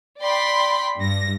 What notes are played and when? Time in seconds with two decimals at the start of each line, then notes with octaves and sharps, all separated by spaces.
0.21 D5 G5 B5 C6
0.99 G2 A#6